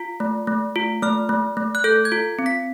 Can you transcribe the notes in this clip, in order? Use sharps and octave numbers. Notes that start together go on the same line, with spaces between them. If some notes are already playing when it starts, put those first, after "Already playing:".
Already playing: F4
A3
A3
F4
A3 F6
A3
A3
F#6
A4 G6
G#6
F4
C4
B6